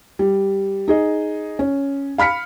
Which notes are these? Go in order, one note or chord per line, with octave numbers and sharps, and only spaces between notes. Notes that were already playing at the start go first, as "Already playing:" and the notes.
G3
D#4 G#4 D#5
C#4
F5 B5 F6 B6 C#7